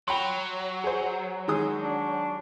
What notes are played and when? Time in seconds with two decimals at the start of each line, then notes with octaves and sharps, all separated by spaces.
0.08 F#3 G5 B5 C6
0.84 G#4 C5
1.48 D#3 G#3 D#6
1.82 D4